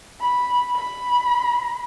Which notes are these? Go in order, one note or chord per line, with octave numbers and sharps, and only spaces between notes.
B5
B5